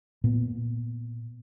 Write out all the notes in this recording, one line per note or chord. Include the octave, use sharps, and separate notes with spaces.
A#2 B3